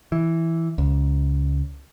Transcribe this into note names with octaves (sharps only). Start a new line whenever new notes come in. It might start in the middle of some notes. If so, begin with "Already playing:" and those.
E3
C#2